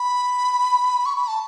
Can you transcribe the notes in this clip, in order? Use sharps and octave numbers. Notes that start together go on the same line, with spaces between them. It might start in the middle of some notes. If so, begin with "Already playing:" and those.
Already playing: B5
C#6
B5
A5